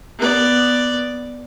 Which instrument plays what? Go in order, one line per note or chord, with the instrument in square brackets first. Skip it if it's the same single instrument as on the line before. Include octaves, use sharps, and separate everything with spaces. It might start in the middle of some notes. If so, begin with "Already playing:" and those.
[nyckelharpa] B3 D5